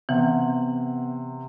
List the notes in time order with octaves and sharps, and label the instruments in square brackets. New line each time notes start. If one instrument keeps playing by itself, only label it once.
[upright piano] C3 [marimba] E3 [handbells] B3